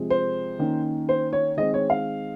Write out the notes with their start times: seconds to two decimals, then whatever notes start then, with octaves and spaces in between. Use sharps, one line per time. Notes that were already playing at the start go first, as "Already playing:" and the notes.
Already playing: C3 F3 G#3
0.10 C5
0.59 D#3 A#3 C#4
1.09 C5
1.33 C#5
1.57 D#3 G#3 C4 D#5
1.74 C#5
1.90 F5